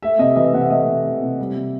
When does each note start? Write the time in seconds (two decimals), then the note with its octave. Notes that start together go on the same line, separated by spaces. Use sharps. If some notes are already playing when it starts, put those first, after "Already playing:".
0.02 A3 E5
0.19 C3 D#5
0.36 E3 D#5
0.54 C3 F#5
0.62 E5
0.70 A3 D#5
0.79 E5
0.87 C3
1.05 E3
1.22 C3
1.39 G3
1.56 C3